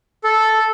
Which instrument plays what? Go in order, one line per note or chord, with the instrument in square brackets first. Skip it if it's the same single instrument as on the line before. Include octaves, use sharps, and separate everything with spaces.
[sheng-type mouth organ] A4